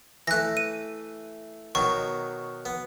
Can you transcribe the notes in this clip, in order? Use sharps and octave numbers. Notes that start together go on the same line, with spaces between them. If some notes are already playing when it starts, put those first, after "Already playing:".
E3 A3 F#6 A#6
D#7
B2 D#3 F#3 C#6
B3